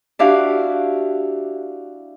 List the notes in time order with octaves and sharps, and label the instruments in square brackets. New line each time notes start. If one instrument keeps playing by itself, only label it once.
[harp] D4 E4 F#4 G4 F5